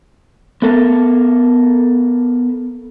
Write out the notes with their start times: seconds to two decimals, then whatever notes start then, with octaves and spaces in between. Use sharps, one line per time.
0.62 B3 A4 A#4